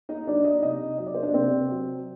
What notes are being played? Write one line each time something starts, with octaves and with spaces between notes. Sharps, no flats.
D#4 D#5
F#3 D4 D5
D#4 D#5
C3 D#4 D#5
F#3 D#5
D5
C5
D4 D5
C3 C4 C5
F#3